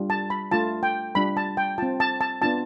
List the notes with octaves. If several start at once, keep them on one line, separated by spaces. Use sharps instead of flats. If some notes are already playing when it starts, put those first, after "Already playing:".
Already playing: G3 D4 F4
A5
B5
A3 D4 F4 A5
G5
G3 D4 F4 B5
A5
G5
C4 F4 A5
A5
A5
B3 D4 F4 A5